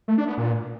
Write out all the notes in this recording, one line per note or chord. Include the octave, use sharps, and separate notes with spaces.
A3
D4
B3
A#2